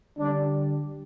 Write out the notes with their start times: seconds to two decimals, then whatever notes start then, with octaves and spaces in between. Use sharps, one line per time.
0.19 D3 G3 D4